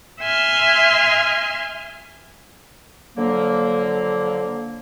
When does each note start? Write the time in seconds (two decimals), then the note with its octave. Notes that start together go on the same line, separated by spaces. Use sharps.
0.21 E5 G#5 C6 F6
3.16 D3 F3 F#3 A#3